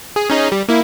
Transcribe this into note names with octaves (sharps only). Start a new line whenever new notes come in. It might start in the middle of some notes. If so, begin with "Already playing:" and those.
G#4
C#4 D#4 G#4
G3
A#3 E4